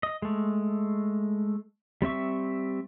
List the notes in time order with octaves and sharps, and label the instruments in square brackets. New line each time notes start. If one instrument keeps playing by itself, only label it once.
[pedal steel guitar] D#5
G#3 A3
G3 C4 E5 C#6